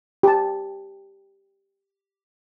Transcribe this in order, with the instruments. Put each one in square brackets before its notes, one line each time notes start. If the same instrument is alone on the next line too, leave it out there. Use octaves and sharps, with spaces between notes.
[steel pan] G4 A5